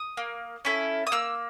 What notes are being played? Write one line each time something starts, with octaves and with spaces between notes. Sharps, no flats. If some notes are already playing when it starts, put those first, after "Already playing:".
Already playing: D#6
A#3
C#4 E4 A4
D#6
A#3 E6